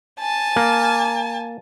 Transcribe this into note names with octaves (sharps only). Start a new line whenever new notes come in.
G#5 A5
A#3